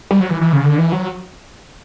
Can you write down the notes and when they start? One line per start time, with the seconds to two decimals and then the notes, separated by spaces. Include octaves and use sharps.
0.11 G3
0.20 F#3
0.30 E3
0.41 E3
0.53 C#3
0.64 D3
0.78 E3
0.92 F#3